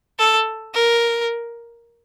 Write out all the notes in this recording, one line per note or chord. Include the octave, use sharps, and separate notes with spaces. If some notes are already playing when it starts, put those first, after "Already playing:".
A4
A#4